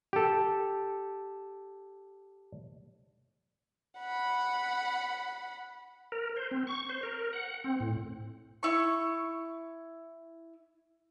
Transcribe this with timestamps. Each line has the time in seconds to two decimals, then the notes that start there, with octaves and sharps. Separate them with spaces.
0.13 G4 A4
3.99 F#5 B5
6.12 A#4
6.36 C5
6.51 C4
6.67 C#6
6.89 C5
7.03 A#4
7.33 F#5
7.64 C4
7.80 A2
8.63 E4 C#6